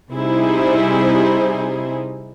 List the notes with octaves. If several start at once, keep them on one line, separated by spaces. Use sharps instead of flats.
C3 G3 D#4 E4 G#4 C5